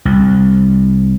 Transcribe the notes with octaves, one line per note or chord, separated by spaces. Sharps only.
C2